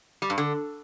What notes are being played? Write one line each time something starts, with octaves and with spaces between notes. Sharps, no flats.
G3
G2
D3